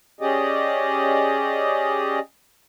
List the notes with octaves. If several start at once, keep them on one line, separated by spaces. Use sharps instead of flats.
C#4 G4 G#4 D5 D#5